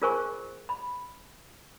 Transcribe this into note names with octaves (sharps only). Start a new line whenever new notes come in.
F4 G#4 A#4 C5 G#5 C#6
B5